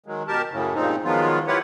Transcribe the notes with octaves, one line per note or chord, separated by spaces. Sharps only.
D#3 F#3 G#3
B2 G4 A#4 A5
F#2 A2 C#3
G2 A#2 C#3 F3 C4 D#4
D#3 F3 F#3 G#3 B3 F4
E4 F4 G4 B4 C#5 F#5